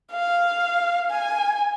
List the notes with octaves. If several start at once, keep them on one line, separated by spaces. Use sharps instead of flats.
F5
G#5